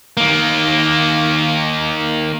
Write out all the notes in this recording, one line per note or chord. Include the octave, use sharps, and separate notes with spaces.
D#3 A#3